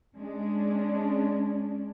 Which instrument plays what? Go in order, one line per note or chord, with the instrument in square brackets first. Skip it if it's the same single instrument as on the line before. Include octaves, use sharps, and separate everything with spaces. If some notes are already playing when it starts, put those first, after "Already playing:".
[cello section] G#3 C#4 D4